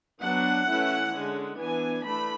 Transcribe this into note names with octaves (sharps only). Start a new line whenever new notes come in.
F#3 B3 D4 F#5
E3 A3 C#4 E4
D3 G#3 C#4
E3 B3 D4 G#5
E3 A3 D4 B5